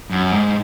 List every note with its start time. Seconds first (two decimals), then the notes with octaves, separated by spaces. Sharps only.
0.10 F#2
0.32 G#2